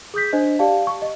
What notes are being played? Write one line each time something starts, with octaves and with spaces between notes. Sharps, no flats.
G#4 D#6 G6 B6
D4 C5 D#5
G4 D5 F5 A5
C#6
D#5